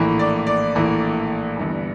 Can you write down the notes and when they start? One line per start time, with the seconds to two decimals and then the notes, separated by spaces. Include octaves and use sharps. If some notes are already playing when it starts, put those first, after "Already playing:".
Already playing: A#1 A2 E3 A#3
0.19 D5
0.47 D5
0.75 A#1 A2 E3 A#3
1.57 G1 G2 E3